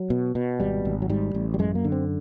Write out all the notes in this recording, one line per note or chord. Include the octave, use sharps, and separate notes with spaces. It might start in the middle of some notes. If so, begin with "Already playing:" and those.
Already playing: F#3
B2
B2
G#1 G3
G#1
F#3
G#2 G3
A1
G3
F#2 G#3
A#3
D3
C4